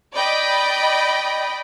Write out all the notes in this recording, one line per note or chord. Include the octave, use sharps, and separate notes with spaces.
D5 D#5 G5 B5